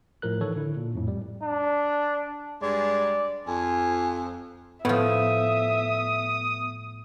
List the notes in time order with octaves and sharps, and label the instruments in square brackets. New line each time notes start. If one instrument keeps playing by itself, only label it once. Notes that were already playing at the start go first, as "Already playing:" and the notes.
[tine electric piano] A2 F3 A#4 F#6
D#3 E3 A4 C#5
D3 E4
A#2
F2 A2
G3
[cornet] D4
[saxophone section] G2 G#3 [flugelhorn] D5
[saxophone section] F2 [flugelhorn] G#5
[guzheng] A2 F3 [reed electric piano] B3 [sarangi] E5 [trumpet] D#6